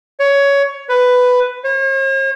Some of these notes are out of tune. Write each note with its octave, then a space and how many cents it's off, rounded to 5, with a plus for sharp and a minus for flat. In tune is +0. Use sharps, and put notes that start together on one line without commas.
C#5 +15
B4 +10
C#5 -45